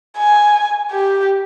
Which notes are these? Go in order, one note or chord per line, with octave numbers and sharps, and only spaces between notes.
G#5
G4